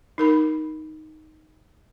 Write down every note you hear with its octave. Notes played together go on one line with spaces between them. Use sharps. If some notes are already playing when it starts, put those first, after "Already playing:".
D#4 A#4 B5